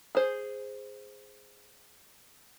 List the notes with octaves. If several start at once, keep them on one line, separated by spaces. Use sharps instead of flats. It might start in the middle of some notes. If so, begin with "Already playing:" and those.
G#4 C5